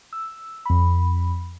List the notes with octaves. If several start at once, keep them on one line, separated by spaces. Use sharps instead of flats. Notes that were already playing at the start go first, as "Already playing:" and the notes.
E6
F2 B5